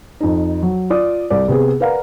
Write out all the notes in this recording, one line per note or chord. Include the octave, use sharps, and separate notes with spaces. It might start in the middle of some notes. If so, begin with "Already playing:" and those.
F2 D#4
F#3
F4 D5 D#6
C2 D5
C3 B3 G#4
A#4 B4 D5 F5 F#5 A#5